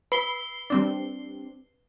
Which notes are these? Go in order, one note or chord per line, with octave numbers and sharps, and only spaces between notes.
B4 B5 C7 G7
G3 C4 D4